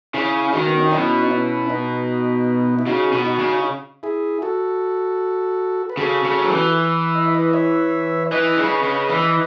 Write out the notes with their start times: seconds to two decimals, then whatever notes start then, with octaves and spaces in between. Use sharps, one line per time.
0.14 C#3 C#4 E4
0.53 D#3 D#4 F#4
0.67 B3
0.76 C#4
0.84 D#4
0.92 B2 C#4 E4
1.23 D#4
1.31 C#4 E4
1.70 B3 D#4
2.79 E4
2.87 C#3 D#4 F#4
3.12 B2
3.25 D#4 F#4
3.39 C#3
4.03 E4 G#4
4.42 F#4 A4
5.89 B4
5.97 C#3 F#4 A4
6.24 C#3
6.42 F#3
6.50 E3
7.15 D#5
7.25 E5
7.34 B4 D#5
7.53 C#5 E5
8.31 E3 B4 D#5
8.57 C#3
8.83 C#3
9.10 E3